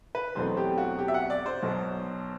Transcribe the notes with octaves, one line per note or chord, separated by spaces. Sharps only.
B4
E2 B2 F#3 A3 C4 C5
G4
F#4
G4
E5
F#5
D5
C5
B1 B2 F#3